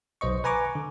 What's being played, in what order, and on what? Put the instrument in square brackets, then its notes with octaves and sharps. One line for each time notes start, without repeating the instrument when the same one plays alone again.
[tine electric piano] B1 C5 D#5 C#6
B4 G#5 A#5 C#6 D6
D3